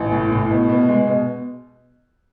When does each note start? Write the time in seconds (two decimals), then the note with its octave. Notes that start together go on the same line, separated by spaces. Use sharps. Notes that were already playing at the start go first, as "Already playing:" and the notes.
Already playing: A1
0.12 A2
0.31 A2
0.51 B2
0.69 B2
0.89 G#3
1.07 B2